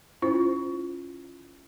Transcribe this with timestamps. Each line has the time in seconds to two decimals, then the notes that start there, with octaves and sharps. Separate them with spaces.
0.22 C#4 E4 F4 C5